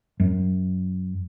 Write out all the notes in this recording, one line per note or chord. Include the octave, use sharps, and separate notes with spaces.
F#2